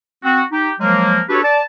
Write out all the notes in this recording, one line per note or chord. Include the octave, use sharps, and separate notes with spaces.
C4 F#4
D#4 G4
F3 F#3 G#3 A#3
D4 F#4 G4 A4 B4 C#5
D5 A5